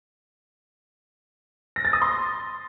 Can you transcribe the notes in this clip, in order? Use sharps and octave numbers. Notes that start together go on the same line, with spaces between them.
A#6
A6
D#6
C6